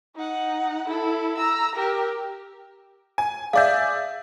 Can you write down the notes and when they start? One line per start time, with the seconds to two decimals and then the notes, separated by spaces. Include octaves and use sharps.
0.16 D#4 F#5
0.88 E4 A4
1.38 A#5 E6
1.76 G4 A#4
3.18 G#5
3.53 G#4 D5 E5 F5 G6